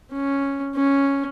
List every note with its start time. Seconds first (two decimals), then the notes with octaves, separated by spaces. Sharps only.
0.12 C#4
0.76 C#4